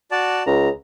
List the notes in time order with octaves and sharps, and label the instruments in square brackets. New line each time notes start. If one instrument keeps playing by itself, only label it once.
[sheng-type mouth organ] F#4 D5 A5
[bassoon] C#2 [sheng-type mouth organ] A#5